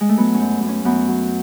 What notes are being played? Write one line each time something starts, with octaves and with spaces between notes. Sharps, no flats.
G#3
A3
F#3 B3
C#4
F#2
F#2
C#4
F#2 B3
F#3